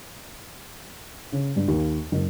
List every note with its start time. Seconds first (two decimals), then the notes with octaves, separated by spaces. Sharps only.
1.32 C#3
1.56 G2
1.68 D#2
2.12 F#1